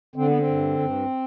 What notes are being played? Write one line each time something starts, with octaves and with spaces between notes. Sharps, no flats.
D3 C4
B3
C4
G2
G2